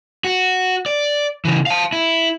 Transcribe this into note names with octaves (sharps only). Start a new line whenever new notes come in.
F#4
D5
C#3 E3
F5 A5
E4